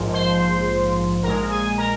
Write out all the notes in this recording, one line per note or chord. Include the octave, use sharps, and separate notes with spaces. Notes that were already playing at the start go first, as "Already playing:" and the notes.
Already playing: A#1 G#2 F3
C5 C6
A#1 A#2 G#3 A#4 A#5
G#4 G#5
A#4 A#5